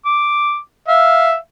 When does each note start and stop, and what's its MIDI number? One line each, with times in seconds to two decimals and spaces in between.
0.05 0.58 86
0.88 1.35 76
0.88 1.35 77